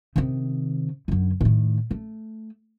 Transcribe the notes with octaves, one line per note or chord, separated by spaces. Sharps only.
C3 D#3
F#2 D3
A2 D#3
A3